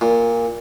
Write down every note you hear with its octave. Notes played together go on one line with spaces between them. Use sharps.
A#2